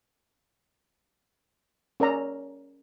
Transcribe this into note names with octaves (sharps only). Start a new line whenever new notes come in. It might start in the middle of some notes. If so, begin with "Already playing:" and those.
C#4 A#4 D5 A#5